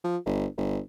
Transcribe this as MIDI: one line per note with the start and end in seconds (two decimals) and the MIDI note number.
0.04 0.17 53
0.26 0.46 31
0.57 0.79 31